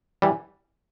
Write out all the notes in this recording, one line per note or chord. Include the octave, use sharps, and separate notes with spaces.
E3 G3